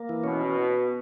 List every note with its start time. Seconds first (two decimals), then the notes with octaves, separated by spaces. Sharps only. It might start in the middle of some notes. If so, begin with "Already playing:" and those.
Already playing: A#3
0.09 E3
0.23 B2 C#4